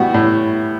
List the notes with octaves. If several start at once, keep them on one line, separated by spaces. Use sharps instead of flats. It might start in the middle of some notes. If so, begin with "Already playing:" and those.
Already playing: A2 G3 B3 F#4
A2